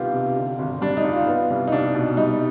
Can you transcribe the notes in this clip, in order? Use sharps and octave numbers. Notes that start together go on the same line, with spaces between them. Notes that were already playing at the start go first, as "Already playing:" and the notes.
Already playing: C2 B2 D#3 B3 F4 G4
C3
D3
G#1
G3 D4
D#4
G2
F4
B3
C2
D#4
C2 D4
B2
G3 D#4